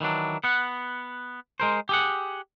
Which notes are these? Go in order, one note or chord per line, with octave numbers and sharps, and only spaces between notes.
D#3 E3 F#3 D4
B3 F#5
G#3 A#4 C5
G4 G#4 F#5